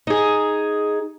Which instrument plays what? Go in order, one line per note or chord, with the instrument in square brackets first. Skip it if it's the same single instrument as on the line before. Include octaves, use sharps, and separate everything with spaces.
[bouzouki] D#4 G#4